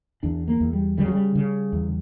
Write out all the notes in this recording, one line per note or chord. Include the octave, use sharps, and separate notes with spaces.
E2 D4
A#3
E2
G3
C#3 G3
F#3
G3
C#3
E2